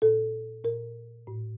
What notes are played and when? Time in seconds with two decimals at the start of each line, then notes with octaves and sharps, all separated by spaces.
0.02 A#2 A4
0.64 A#2 A#4
1.27 A2